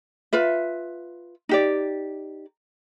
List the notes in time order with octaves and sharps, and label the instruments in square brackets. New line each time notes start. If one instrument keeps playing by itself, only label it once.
[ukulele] F4 B4 E5
D#4 G4 D5